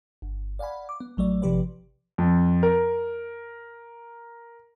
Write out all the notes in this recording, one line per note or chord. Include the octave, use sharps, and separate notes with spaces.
G1
D5 F5 F#5 G#5 B5
D6
B3
A1 F#3 A3 D5
G#1 C3 F3 G4 B4 D5
F2
A#4